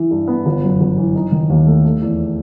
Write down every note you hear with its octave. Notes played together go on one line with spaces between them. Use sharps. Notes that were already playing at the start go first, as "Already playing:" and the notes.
Already playing: E3 E4
G2
B3
G1
F#2
G1
E3
D#4
D#3
D#2
A3
A3
E2